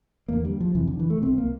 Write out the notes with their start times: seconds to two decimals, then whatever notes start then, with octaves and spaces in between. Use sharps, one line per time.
0.28 E2 D3 A#3
0.45 G3
0.60 F3
0.75 F2 C3 E3
0.87 D3
0.99 E3
1.10 A3
1.22 C2 C3 C4
1.38 A#3